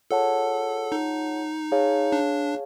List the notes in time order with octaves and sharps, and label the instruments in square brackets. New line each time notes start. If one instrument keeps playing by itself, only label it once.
[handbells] F4 G#4 C#5 F#5 A5 [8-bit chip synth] A4
[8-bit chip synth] D#4
[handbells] G#4 C#5 F5 A5
[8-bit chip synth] D4